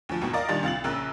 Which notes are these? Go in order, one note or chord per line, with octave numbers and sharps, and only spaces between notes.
D2 F3
D#2 G#2 B2
A#4 D5 D#5 F5
A#2 D#3 G3 D4 A6
C2 F4 A6 F#7
A#1 C#3 A#4 E6 F#6